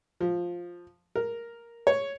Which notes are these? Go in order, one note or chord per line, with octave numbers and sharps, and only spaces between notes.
F3
A#4
C#5